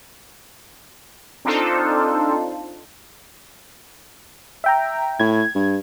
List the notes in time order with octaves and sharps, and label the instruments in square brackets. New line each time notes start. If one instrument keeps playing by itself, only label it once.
[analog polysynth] C4 D4 D#4 F4 A4 C5
[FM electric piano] E5 G5 A#5
[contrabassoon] A2 [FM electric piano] G#6
[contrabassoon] G2